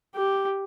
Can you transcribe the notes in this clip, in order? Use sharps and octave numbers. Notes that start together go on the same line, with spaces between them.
G4